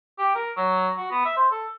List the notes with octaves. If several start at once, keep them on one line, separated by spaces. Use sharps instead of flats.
G4
A#4
F#3
F#4
B3
E5
C5
A4